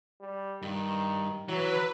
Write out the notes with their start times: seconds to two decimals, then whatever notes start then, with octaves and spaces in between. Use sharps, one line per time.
0.21 G3
0.63 G2 D#3
1.49 E3 F#3 B4